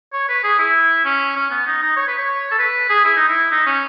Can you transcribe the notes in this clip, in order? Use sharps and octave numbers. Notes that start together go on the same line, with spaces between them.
C#5
B4
G#4
E4
C#4
C#4
B3
D#4
D#4
C#5
B4
C#5
A4
B4
G#4
E4
D#4
E4
D#4
C#4